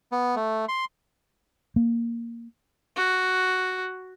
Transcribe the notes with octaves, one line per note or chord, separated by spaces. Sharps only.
B3
A3
C6
A#3
F#4